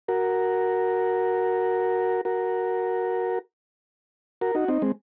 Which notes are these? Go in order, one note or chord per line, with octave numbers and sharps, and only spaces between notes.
F#4 A#4
F#4 A#4
F#4 A#4
D#4 F#4
C4 D#4
G#3 C4